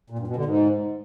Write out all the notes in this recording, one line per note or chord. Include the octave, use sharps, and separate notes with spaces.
A#2
G2
B2
D3
G#2